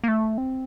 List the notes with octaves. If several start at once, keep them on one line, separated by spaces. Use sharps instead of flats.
A#3
A3
C4